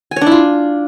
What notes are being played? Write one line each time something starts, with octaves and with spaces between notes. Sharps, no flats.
G#5
C#5
D4
E4
F4